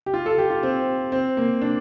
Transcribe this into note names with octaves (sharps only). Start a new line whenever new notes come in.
G4
F4
A4
G4
F4
C4
C4
A#3
D4